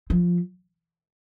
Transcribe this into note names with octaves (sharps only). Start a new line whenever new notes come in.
F3